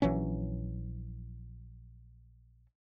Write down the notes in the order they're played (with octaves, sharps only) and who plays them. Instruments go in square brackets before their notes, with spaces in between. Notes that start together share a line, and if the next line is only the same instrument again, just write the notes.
[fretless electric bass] A#1 E3 F#3 C#4